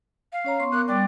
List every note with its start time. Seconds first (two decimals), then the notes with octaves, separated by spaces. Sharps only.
0.33 F5
0.44 C#4 C#5 A#5
0.60 B3 C6 C#6
0.72 B3 A#4 D6 F#6
0.88 G3 D5 G5 D6